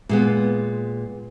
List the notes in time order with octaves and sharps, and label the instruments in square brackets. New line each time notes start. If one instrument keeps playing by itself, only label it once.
[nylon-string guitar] A#2 G#3 B3